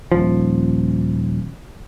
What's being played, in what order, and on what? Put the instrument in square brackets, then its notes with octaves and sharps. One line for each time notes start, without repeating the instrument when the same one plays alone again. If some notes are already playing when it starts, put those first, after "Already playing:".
[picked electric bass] D#1 F3